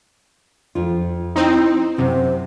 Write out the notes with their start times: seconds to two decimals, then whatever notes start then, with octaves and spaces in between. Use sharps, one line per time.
0.75 F2 F4
1.36 C4 D#4 E4
1.98 F#2 C3 C5